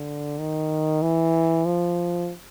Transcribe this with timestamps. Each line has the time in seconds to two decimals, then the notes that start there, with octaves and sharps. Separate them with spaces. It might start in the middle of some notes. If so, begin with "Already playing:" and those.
Already playing: D3
0.39 D#3
1.02 E3
1.65 F3